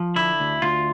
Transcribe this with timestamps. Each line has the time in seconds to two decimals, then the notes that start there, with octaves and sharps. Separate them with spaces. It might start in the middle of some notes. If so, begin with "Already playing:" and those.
Already playing: F3
0.16 D3 E4
0.40 D2
0.62 D2 F4